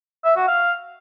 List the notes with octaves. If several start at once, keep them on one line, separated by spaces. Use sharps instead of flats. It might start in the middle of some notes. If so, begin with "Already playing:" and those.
E5
F#4
F5